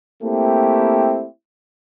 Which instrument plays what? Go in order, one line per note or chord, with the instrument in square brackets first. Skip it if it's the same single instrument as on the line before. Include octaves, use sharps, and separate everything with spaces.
[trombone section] A3 A#3 C4 E4 G4